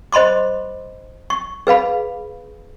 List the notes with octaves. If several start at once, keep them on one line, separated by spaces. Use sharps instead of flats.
C5 D#5 B5 C6 D6
C#6
G#4 B4 F5 B5